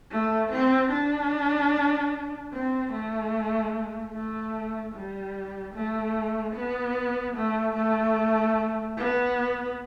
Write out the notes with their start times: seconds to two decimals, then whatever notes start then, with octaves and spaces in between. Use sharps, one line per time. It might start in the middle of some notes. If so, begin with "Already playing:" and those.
0.11 A3
0.52 C4
0.92 D4
2.52 C4
2.92 A3
4.13 A3
4.94 G3
5.74 A3
6.55 B3
7.36 A3
7.76 A3
8.97 B3